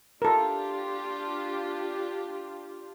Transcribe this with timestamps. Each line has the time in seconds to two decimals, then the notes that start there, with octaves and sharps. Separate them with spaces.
0.22 D4 F4 G4 A4 A#4